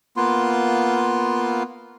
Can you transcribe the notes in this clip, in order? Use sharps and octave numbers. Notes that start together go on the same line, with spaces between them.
A#3 B3 F4 C6